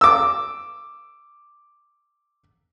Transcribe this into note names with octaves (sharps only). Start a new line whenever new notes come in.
D6 E6